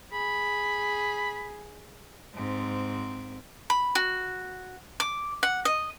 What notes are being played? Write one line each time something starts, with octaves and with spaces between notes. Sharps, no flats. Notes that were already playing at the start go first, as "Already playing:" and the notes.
G#4 B5
G#2 C4
B5
F#4
D6
F#5
D#5